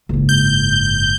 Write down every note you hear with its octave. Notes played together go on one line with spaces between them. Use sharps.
F#1 G#2
G6